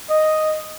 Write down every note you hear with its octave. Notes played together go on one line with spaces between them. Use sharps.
D#5